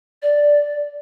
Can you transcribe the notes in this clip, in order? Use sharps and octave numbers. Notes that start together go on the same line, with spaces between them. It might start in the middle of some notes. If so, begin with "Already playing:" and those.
D5